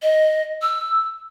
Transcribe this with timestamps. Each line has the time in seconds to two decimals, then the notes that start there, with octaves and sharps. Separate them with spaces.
0.02 D#5
0.62 E6